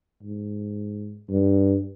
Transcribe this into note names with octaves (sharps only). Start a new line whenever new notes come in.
G#2
G2